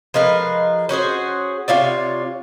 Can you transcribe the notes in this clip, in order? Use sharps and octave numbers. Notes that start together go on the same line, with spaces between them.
F3 G#3 A#4 B4
C#4 F#4 G#4 C5
C3 F4 C#5 D5